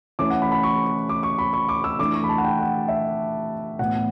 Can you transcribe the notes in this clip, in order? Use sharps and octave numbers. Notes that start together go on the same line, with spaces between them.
E3 A3 C#4 D6
F#5
B5
B5
C#6
D6
C#6
B5
C#6
D6
E6
E3 A3 D4 D6
C#6
B5
A5
F#5
G5
F#5
E5
A2 E3 B3 F#5